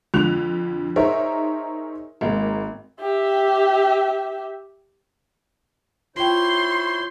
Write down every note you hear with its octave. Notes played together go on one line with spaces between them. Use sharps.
F2 D3 F#6 F7
D#4 G#4 A#4 C5 C#5 E5
G#1 G#3 A#3 A#4
G4 E5
E4 F4 C5 C#5 G5 C6